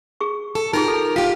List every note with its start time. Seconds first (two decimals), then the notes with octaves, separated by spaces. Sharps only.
0.21 G#4 C#6
0.55 A4
0.73 D#4 F4 G4 G#4 A#4
0.88 A4
1.16 F4 G4 F5